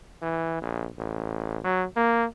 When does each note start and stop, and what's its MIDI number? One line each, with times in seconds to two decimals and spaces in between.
0.22 0.59 52
0.61 0.87 34
0.98 1.59 33
1.64 1.85 54
1.96 2.25 58